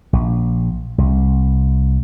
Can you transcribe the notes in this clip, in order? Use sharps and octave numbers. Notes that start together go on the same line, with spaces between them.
A#1
C2